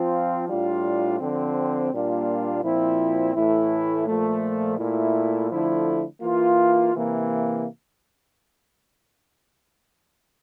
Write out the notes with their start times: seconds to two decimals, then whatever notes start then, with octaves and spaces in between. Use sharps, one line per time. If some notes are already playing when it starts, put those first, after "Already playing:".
Already playing: F3 C4 F4
0.48 A2 G3 D4 F4
1.19 D3 F3 C4
1.92 A#2 G3 A#3 D4 F4
2.64 A#2 F3 C4 E4
3.35 A2 E3 A3 E4
4.07 A#2 F3 A3
4.78 A#2 A3 E4
5.50 D3 F3 A3 E4
6.21 E3 A#3 F4
6.94 C3 E3 A#3